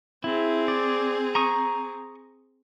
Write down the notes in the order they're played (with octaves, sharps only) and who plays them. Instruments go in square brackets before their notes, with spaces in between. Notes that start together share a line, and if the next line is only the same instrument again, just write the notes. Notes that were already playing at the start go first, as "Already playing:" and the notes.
[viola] C4 G#4 [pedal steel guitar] E4
[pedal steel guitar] D5
A#5 C#6 D#6